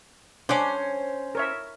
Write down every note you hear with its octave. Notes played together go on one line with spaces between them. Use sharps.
C#4 D4 C5 F#5 D6
A#4 C#5 E5